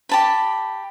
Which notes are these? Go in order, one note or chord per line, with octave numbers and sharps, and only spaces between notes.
G4 A5 B5